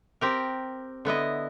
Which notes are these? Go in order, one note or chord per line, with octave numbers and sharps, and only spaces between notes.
C4 G4 A#4
D3 B3 E4 D#5